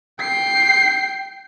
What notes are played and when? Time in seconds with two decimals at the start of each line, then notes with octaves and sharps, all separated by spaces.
0.20 G5 C7